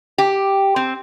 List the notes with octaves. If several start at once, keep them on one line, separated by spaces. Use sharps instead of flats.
G4
C4